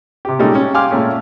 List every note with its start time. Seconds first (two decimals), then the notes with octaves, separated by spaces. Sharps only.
0.25 C3 G4
0.39 A#2 G3 G#3 C#4 D#4 A4
0.55 C#4
0.74 F5 G5 G#5 C6 D6 F6
0.91 A#2 G#3 A3 C#4